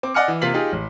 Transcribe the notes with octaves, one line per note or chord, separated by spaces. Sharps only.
C4 D6
D5 D#5 F#5 G#5 F6 C#7
E3
C3 A#3 F4 B6 F#7
D#4 F4 G4 G#4
A1